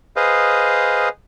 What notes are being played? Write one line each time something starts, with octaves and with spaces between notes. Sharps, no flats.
G#4 B4 C5 D#5 F5